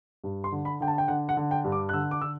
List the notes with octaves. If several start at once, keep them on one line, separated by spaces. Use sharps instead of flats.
G2
C6
D3
B5
D3 G5
A5
G5
D3 F#5
F#5
D3
G5
G2
D6
F#6
D3 E6
D6
D3 E6